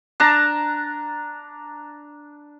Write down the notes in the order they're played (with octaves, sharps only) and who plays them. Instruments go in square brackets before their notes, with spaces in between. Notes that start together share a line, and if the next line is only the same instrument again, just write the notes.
[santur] D4 A5 A#5